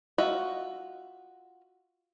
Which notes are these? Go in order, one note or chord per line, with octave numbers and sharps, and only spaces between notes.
F4 F#4 D#5 E5